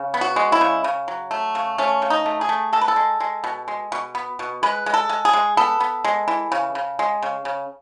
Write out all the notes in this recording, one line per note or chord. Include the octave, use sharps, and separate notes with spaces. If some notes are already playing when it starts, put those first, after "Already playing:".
Already playing: C#3
B3
F#4
G#3
E4
C#3
C#3
F#3
A3
C#3
A3 C#4
C#3
D#4
A3
G#4
A3
G#3 A4
B4
A4
G#3
G#3
B2
G#3
B2
B3
B2
G#3 B4
G#3
A4
G#3
G#4
G#3
B3 A4
B3
G#3
E3
C#3
C#3
G#3
C#3
C#3